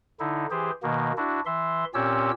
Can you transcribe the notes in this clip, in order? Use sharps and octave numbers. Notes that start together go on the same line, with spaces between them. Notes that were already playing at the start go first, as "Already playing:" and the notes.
D3 D#4 E4
E3 G4 G#4 C5
B2 D#3 A#3
D4 E4 F#4
E3 E5 C6
A#2 C4 C#4 G4 C#5 E6